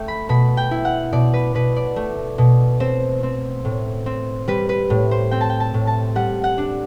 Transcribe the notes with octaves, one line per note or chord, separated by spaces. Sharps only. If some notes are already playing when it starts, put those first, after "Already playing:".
Already playing: A3 E5 G5
B5
B2 B5
G5
E4
F#5
B2 D5
B4
B2 B4
D5
A3
B2
C4 C5
C4
A2
C4
G3 B4
B4
A2
C5
C4 G5
A5
G5
A5
A2
A5
G3 F#5
F#5
D4